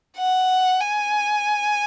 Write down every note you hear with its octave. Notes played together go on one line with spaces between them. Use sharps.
F#5
G#5